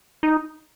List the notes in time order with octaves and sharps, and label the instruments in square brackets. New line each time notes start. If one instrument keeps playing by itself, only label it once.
[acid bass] D#4